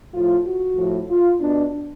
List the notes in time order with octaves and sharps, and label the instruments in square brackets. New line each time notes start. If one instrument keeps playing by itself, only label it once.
[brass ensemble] A2 F3 F4
F#4
A2 F3
F4
B2 D4